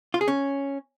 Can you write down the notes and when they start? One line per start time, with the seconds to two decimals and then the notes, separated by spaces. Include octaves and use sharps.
0.14 F4
0.21 G#4
0.28 C#4